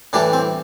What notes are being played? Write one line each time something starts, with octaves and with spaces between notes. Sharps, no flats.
A2 E3 G3 D4
C4